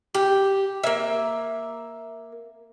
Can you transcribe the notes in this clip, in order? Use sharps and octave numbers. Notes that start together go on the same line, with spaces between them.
G4
A#3 E5